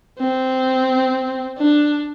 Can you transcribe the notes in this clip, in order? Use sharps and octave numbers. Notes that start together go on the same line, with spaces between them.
C4
D4